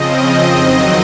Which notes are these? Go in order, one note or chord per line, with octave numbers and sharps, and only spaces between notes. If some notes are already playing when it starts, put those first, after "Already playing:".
Already playing: C#3 F3 C4 D#5
F2 D#3 F#3 C4